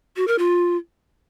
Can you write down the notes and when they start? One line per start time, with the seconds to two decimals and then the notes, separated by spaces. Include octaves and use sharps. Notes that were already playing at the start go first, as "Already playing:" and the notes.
0.17 F#4
0.28 A#4
0.39 F4